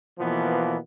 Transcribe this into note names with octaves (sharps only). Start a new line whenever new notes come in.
B2 E3 F3 A#3 B3